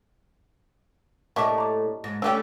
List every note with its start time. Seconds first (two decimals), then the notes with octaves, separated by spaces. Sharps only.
1.36 A2 G3 A#3 D4 D#5 E5 A5 C#6
1.58 A#5 D6
2.04 G#2 A#6
2.22 G3 A3 C#4 D4 F4 G4 E6